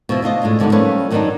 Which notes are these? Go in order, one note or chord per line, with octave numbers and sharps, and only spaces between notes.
B2 F3 E4
D3 A3 F4 D#5
A2 G#3 D4
G#2 D3 F#3 G3 A3 B3
F3 G3 A3 A#3 C#4 B4
F#2 D#3 F#3 G3 D4 D#4